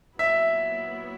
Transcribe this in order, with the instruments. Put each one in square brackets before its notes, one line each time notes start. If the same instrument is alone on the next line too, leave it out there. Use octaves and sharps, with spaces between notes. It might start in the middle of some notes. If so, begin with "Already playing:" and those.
[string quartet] A#2 F#3 B3 E4 [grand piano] E5